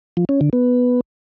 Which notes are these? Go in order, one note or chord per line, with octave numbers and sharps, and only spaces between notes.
F3
C#4
D3
B3